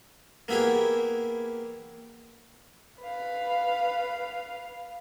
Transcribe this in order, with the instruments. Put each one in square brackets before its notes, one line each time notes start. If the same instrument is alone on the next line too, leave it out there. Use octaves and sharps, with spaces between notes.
[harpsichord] A#3 B3 E4 G4 G#4
[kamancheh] B4 F5